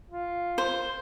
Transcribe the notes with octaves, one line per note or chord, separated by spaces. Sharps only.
F4
C5